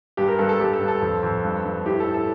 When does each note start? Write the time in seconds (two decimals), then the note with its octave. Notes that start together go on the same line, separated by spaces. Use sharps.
0.17 G2 G4
0.28 A#4
0.38 G2 A4
0.49 A4
0.60 G2 G4
0.73 A4
0.81 G2
0.88 A4
1.01 F2
1.23 F2
1.44 G2
1.65 G2
1.86 A2 G4
2.00 A4
2.07 A2
2.14 A4